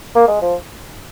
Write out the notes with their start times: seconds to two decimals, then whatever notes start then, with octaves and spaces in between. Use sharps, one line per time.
0.15 A#3
0.28 G#3
0.42 F3